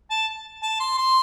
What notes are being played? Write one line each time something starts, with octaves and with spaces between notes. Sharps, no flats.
A5
A5
C6
C6